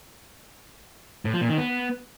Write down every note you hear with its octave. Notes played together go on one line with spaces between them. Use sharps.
A2
F3
A#2
D#3
B3